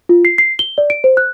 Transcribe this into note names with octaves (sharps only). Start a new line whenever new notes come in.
F4
C7
C7
G7
D5
D7
C5
F#6